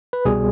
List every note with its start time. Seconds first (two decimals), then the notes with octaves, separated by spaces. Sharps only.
0.13 B4
0.25 C2 B2 G3 G#4